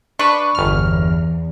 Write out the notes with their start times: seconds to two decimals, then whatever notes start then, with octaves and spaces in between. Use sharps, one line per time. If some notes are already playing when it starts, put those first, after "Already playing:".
0.19 D4 B4 C#6
0.55 G1 E2 F6